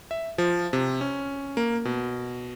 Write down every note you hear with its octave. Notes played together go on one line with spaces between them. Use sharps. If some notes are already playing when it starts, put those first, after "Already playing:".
E5
F3
C3
C#4
A#3
B2